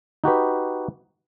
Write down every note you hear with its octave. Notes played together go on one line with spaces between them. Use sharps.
D#4 F#4 G4 B4